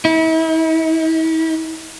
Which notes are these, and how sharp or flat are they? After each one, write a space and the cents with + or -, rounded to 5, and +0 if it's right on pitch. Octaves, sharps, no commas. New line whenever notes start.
E4 -40